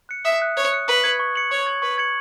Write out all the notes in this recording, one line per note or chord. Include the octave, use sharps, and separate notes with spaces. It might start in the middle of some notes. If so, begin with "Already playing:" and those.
F#6 C#7
E5 D#6
F#6 C#7
C#5 D#6
F#6 C#7
B4 C#6
G#6 C#7 F#7
C#6
G#6 C#7 F#7
C#5 C#6
G#6 C#7 F#7
B4 C#6
G#6 C#7 F#7